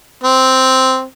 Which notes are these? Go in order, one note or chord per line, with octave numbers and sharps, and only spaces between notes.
C4